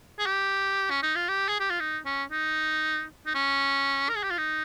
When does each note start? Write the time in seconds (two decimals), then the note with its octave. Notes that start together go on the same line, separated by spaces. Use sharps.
0.19 G#4
0.26 G4
0.90 C#4
1.03 D#4
1.16 F4
1.28 G4
1.49 G#4
1.60 G4
1.70 F4
1.80 D#4
2.06 C#4
2.31 D#4
3.26 D#4
3.35 C#4
4.09 A#4
4.16 G#4
4.23 G4
4.30 F4
4.38 D#4